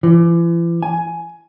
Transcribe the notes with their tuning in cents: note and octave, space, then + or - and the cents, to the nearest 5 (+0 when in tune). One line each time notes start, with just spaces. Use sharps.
E3 +40
G#5 +10